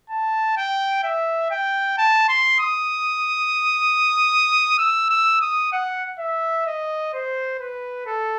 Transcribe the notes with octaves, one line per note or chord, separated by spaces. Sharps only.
A5
G5
E5
G5
A5
C6
D#6
E6
E6
D#6
F#5
E5
D#5
C5
B4
A4